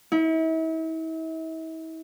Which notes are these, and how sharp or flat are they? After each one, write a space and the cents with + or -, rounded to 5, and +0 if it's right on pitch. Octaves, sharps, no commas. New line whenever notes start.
E4 -40